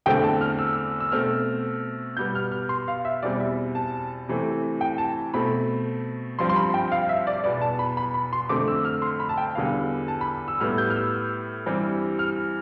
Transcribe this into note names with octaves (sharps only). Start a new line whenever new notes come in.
E2 D3 A3 C4 G5
A5
F6
E6
E6
B2 A3 C4 F6
B2 G3 B3 G6
F6
F6
C6
F5
E5
E2 B2 G3 C4 D5
E5
A5
C3 E3 A3 C4
G5
A5
B2 A3 C4 B5
G2 F3 C4 C6
C6
B5
G5
F5
E5
D5
E2 B2 B3 D5
A5
B5
B5
B5
C6
F2 D3 A3 C4 D6
E6
F6
C6
B5
A5
G5
E2 D3 G3 B3 F5
A5
B5
E6
A2 G3 B3 F6
G6
F6
E6
G2 E3 G3 C4
F6